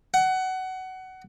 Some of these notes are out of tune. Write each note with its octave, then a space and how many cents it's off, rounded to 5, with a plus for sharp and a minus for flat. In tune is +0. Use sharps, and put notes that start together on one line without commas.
F#5 +20